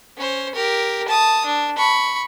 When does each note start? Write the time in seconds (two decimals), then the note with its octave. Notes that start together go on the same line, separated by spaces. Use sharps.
0.17 C#4 C5
0.55 G4 A#4
1.08 A5 D#6
1.45 D4
1.78 B5 C#6